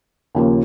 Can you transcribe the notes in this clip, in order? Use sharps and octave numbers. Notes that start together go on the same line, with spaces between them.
D#2 C#3 F3 A#3